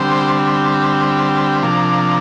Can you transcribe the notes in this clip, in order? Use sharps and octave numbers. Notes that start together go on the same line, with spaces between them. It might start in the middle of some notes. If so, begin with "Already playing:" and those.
Already playing: D3 G3 C4 C5
C3 F3 A#3 D4